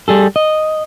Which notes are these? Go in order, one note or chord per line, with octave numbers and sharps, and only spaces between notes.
G3 G#4 A4
D#5